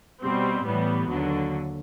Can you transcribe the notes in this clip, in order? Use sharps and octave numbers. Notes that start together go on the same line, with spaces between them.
B2 G3 C4
A2 E3 G3 B3
D#2 D3 F#3